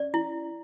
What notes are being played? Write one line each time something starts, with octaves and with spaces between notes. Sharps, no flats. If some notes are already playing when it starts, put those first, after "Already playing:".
Already playing: C#4 D5
E4